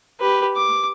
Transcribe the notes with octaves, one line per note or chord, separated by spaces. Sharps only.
G4 B4
D6